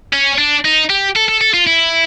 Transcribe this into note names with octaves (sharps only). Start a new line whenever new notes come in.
C#4
D4
D#4
G4
A4
A4
A4
F4
E4